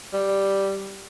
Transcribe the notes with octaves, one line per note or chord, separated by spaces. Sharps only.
G3